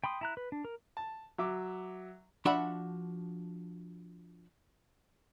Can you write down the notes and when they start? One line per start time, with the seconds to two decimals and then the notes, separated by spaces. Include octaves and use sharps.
0.04 G5 B5 C6 D#6
0.21 E4 A#5 F#6
0.37 B4
0.52 D4
0.65 A#4
0.97 A5
1.38 F#3 E5 D6
2.45 F3 D4 F#4 E5 F#5 B5